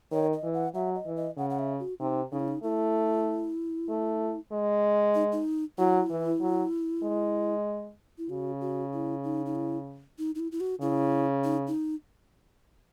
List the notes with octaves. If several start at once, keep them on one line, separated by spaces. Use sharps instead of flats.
D#3 C#5
D#5
E3
F#5
F#3 E5
D#5
E3
D#5
C#3 F#5
F#5
E5
F#4
C3 D#4
C#3 D#4
E4
D#4
A3 E4
A3
G#3
D#4
D#4
F#3 E4
E3
F#3
G#3
E4
C#3 F#4
F#4
E4
D#4
D#4
E4
D#4
D#4
E4
E4
F#4
C#3 E4
D#4
D#4